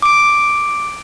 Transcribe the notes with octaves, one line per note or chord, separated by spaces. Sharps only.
D6 D7